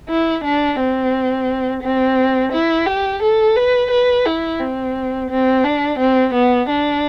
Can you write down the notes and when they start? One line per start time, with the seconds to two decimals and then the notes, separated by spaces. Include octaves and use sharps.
0.09 E4
0.44 D4
0.79 C4
1.82 C4
2.52 E4
2.86 G4
3.22 A4
3.56 B4
3.91 B4
4.25 E4
4.60 C4
5.30 C4
5.64 D4
5.99 C4
6.34 B3
6.69 D4